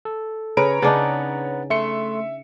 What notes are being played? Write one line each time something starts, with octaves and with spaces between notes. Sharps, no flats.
A4
C#3 B4 C#5 A#5 D7
C#3 D4 D#4 B4 F#5 A6
A3 E5 C6 C#7